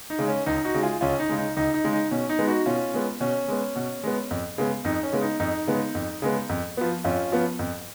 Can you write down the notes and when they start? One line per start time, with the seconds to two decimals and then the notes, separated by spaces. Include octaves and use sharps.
0.10 D#4
0.19 C#3 G#3
0.28 C#4
0.46 C#2 D#4
0.64 D#4 F#4
0.74 C#3 G#3
0.83 F4 G#4
1.01 C#2 C#4 F4
1.19 D#4
1.29 C#3 G#3
1.38 D#4
1.57 C#2 D#4
1.74 D#4
1.84 C#3 G#3
1.93 D#4
2.11 B2 C#4
2.29 D#4
2.39 G#3 B3
2.47 D#4 F#4
2.66 B2 C#4 F4
2.94 G#3 B3
3.20 B2 C#4
3.48 G#3 B3
3.76 B2
4.04 G#3 B3
4.31 F2
4.58 C#3 G#3 B3
4.85 F2 D#4
5.03 C#4
5.13 C#3 G#3 B3
5.22 D#4
5.40 F2 D#4
5.67 C#3 G#3 B3
5.95 F2
6.22 C#3 G#3 B3
6.49 F2
6.77 F3 B3
7.04 F2 C#4 F4
7.32 F3 B3
7.59 F2